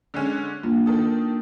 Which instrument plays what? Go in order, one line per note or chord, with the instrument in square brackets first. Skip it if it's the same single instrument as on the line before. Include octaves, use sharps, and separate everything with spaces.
[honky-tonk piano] D3 G#3 C#4
[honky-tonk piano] G2 [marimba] A#3 D4 F4
[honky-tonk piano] D#3 A4 D#6